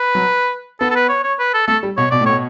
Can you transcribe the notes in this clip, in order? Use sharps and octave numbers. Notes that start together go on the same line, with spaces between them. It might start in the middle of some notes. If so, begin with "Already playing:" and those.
Already playing: B4
F#3
B3 A4
A4
B4
C#5
C#5
B4
A4
A3 A4
G3
B2 C#5
B2 D5
A2
B2 C#5